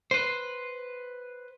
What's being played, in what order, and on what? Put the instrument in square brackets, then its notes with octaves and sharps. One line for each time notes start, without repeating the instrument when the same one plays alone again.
[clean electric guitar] B4 C5